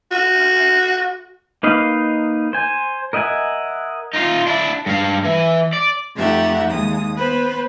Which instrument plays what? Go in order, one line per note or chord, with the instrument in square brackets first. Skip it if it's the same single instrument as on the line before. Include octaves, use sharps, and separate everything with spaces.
[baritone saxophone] F#4
[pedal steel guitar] A#3 D#4 B4 D#5 F5
C5 G#5
A#4 D#5 E5 F#5 G#5
[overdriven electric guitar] D#4 F4
D4 E4
G2 F5
E3
D5
[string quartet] F2 A3 D#4 G4 E5 F#5
D#2 G#3 D#6
B3 B4 C5 B5